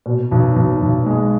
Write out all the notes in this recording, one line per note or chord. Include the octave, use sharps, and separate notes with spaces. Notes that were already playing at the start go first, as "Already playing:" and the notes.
B2
B1
B1
B1
G#3